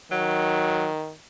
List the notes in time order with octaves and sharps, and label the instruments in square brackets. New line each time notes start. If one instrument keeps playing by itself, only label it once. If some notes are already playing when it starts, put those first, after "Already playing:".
[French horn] D#3 [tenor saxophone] F#3